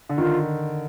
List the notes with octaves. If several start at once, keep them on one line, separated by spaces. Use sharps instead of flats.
D3
D#3 F4